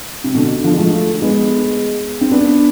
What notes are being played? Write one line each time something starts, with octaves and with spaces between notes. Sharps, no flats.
C3
B2 D3
D3 F3
G#3
F3 A3
G#3 B3
C4
B3 D4